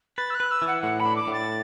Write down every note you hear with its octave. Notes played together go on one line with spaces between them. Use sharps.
B4 A6
E6
F#6
B4
E6
E3
F#5
A2 F#5
B5
D4
D6
A2
A6